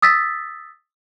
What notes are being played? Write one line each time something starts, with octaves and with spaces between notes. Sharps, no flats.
D#6 E6 A6 B6